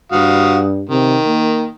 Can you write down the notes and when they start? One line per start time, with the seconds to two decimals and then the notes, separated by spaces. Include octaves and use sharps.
0.12 G2 F#4 F5 D#6
0.89 C3 D#3
1.26 A#3